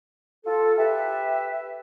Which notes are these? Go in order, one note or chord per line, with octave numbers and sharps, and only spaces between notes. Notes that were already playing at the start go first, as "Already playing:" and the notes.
F4 A4
G4 B4 E5